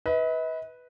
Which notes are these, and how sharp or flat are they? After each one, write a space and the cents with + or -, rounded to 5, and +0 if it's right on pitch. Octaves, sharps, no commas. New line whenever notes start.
B4 +0 D#5 +45